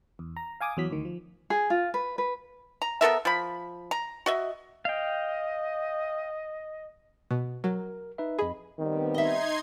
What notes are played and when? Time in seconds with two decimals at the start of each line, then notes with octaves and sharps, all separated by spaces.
0.19 E2
0.37 A#5
0.61 F5 G#5 D6 D#6
0.77 E2 F#3 B6
0.91 D2 D#3
1.05 F3
1.50 G#4
1.70 F4
1.94 B4
2.18 B4
2.82 A#5
3.01 B3 A4 A#4 E5
3.25 F3 B5
3.91 A#5
4.26 F#4 D#5 E5
4.85 D#5 F5 G5
7.31 B2
7.64 F#3 A#4
8.18 D#4 B4 E5
8.39 F2 G#4 D#5 B5
8.79 D#3 G3 B3 C4
9.14 D#4 D#5 E5 C6 G#6